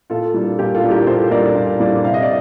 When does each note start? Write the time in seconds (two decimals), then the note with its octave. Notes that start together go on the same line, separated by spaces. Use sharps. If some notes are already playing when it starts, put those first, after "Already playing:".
0.10 A#2 F4 A4
0.34 G3 A#3 D4
0.58 A#2 G4 A#4
0.75 F4 A4
0.83 G3 A#3 D4
0.91 G4 A#4
1.07 A#2 A4 C5
1.31 G3 A#3 D4 A#4 D5
1.55 A#2
1.80 G3 A#3 D4
2.04 C3 F5
2.14 D#5
2.23 D5